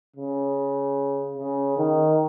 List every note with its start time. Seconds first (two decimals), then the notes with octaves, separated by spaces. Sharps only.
0.16 C#3
1.37 C#3
1.78 D#3